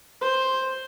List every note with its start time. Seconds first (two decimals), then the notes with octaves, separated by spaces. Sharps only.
0.22 C5